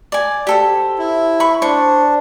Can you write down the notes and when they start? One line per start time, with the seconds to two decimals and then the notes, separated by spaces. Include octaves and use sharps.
0.12 D5 G#5
0.47 G4 A4 C5
0.99 E4
1.40 B5 C#6
1.62 D4 C5 C#6